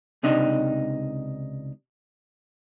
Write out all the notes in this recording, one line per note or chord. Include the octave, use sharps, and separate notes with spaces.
C#2 C3 D4 D#4